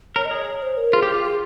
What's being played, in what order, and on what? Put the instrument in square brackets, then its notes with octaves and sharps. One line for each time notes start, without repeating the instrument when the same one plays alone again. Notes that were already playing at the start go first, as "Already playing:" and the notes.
[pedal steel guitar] A#4 [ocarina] C#5
[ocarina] D#5
[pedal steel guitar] G#4 [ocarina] C#5
[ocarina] C5
A#4
[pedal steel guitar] F4 [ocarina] G#4
[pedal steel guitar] G4
[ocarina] G#4
[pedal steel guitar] F4
[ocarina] G#4